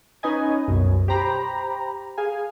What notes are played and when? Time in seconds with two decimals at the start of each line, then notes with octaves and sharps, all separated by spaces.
0.23 C#4 D#4 B4 D#5 G#5
0.68 C2 F#2 B2
1.08 G4 C5 A#5 B5
2.18 G#4 F5 G#5